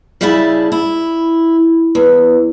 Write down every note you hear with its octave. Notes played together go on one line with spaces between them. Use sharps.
C#3 G3 E4 G#4 E5 A5
E4
E2